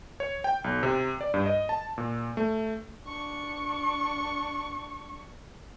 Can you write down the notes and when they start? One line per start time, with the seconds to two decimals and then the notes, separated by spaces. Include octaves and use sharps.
0.20 C#5
0.44 G5
0.64 B1
0.83 C3
1.21 D5
1.34 G2
1.46 D#5
1.69 A5
1.98 A#2
2.37 A3
3.06 D4 C#6